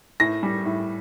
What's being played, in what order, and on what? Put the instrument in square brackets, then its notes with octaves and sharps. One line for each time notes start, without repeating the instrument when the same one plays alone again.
[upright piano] A2 A#6
G3
A2